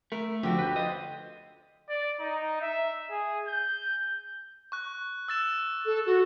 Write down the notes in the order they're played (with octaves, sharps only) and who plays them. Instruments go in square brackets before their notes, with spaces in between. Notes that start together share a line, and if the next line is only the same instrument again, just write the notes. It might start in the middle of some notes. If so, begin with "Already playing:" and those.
[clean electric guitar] A3 [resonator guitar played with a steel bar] A#4 [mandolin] E5
[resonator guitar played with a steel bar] D3 F#4 [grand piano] F3 [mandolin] G4 G5
[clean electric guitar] B4 [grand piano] F#6 G6
[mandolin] F4 C5 [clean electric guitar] D#5
[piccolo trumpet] D5
D#4
E5
G#4
G6
[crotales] C#6 F#6
E6 A6 E7
[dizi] A4
F#4